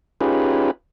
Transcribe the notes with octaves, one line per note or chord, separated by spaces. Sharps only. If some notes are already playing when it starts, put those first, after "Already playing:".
C#4 D#4 F4 G4 G#4 B4